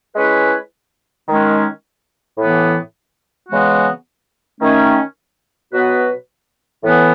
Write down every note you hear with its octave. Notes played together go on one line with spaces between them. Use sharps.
G#3 C#4 E4 B4
D#3 G#3 C#4
A2 E3 B3
C#3 E3 G#3 B3 F#4
D#3 A3 C#4
B2 F#3 B3 F#4 B4
A2 E3 B3